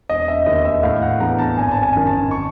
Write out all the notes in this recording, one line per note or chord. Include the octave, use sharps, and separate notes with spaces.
E1 D#5
E5
D#2 D#3 D#5
E5
A2 F5
F#5
E3 G#3 B3 D4 A#5
A5
G#1 G#5
A5
G#5
F#2 D#3
A5
C#6